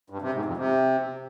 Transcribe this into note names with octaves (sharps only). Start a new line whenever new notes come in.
G2
C3
G#2
F2
C3